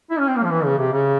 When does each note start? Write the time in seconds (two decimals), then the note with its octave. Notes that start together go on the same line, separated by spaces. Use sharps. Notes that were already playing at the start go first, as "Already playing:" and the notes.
0.10 E4
0.19 C#4
0.28 C4
0.36 A#3
0.44 F3
0.50 E3
0.65 C#3
0.78 C3
0.92 C#3